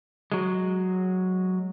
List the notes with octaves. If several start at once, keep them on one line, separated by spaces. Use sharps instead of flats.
F#3 G#3